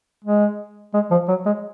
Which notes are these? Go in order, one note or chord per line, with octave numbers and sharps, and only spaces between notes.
G#3
G#3
F3
F#3
G#3